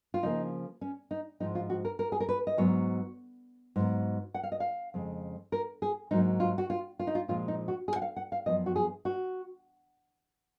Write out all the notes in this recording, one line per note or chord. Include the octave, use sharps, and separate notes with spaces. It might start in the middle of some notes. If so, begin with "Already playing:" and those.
F4
C#3 F3 A#3 D#4
C#4
D#4
G#2 F3 G#3 D#4
F4
F#4
A#4
A#4
G#4
A#4
B4
D#5
G#2 F#3 B3 C#5
G#2 F#3 B3
F#5
F5
D#5
F5
F2 C#3 G#3
A#4
G#4
G#2 F#3 A#3 D#4
F4
F#4
F4
F4
D#4
F4
A#2 F3 G#3 F4
D#4
F#4
G#4
F#5
F5
F#5
F5
F#2 F3 B3 D#5
F#4
G#4
F#4